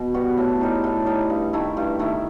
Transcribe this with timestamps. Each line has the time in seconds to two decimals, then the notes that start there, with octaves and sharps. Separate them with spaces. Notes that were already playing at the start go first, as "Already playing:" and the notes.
Already playing: B2
0.14 G3 B3 F#4
0.37 A2
0.61 G3 D#4
0.84 A2
1.06 G3 D#4
1.30 G2
1.53 D#3 A3 E4
1.77 G2
1.99 D#3 A3 E4